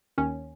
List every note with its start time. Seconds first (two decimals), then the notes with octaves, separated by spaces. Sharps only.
0.18 D#2 D#3 C#4